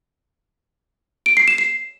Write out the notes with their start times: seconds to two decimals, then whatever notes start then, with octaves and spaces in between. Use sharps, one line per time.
1.26 D7
1.37 C7
1.48 E7
1.58 C7